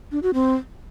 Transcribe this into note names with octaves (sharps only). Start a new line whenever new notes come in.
D4
F#4
C4